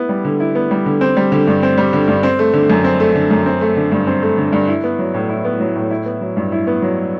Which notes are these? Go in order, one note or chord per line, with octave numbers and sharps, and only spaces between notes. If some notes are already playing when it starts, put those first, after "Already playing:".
Already playing: B3 E4
G3
D3
E4
B3
G3
D3
C4
G3
D3
G2
C4
G3
D3
G2
C4
A3
D3
F#2
C4
A3
D3
F#2
C4
A3
D3
G2
C4
A3
D3
G2
E4
B3
F#3
A2
E4
B3
F#3
A2
E4
B3
F#3
G2
E4
B3
F#3